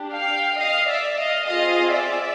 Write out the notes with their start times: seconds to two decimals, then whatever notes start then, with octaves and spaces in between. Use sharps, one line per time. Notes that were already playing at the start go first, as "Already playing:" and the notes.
Already playing: D4 G4
0.14 F5 G5
0.59 D#5 F5
0.89 D5 E5
1.18 D#5 F5
1.48 C4 F4 G#4 D#5 F5
1.92 D5 E5